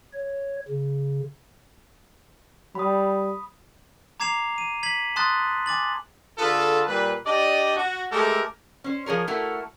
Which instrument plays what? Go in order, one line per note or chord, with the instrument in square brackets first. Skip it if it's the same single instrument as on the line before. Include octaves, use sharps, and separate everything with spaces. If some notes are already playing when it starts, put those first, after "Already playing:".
[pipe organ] C#5
C#3
[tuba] G3 [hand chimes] B5 D#6
[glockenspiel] A#5 D6 G#6 C7 E7 F7
D#7
G#6 B6 F#7
A5 C6 D#6 F#6 A6
G#5 D6 A6 F#7
[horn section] D3 F4 G#4 A4 B4
A#2 G3 B4
D4 G4 D5 D#5
F#4
G#3 A3 G4 A4 A#4
[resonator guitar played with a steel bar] C#4 C5
F3 G#4 A#4 C#5
A3 E4 F#4 A4 A#4